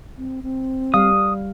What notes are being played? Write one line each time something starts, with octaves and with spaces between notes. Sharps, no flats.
C4
C4
G3 F5 D#6